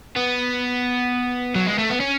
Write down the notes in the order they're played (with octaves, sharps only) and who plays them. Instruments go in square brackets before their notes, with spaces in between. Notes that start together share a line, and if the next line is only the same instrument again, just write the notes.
[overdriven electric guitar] B3
F#3
G#3
A3
B3
C#4